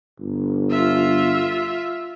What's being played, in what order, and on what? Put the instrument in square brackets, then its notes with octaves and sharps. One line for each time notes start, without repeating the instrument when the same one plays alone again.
[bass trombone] G1
[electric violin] F4 E5